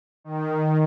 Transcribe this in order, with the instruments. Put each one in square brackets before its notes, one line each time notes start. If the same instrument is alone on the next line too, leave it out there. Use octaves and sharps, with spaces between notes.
[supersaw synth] D#3